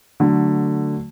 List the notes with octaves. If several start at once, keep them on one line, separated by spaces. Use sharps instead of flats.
D3 F#3 A3